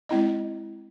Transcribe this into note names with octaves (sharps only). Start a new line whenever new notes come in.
G#3 C4 E4 D#5